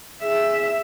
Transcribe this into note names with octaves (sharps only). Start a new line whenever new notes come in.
G#4 E5